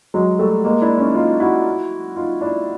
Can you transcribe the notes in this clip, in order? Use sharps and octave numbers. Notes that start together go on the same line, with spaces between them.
F#3 G#3
G3 A3
G#3 A#3
D4 E4
C#4 D#4
D#4 F4
E4 F#4
D#4 F4
D4 E4